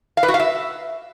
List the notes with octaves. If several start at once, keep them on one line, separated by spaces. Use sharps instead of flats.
F5
B4
F#4
F5
E5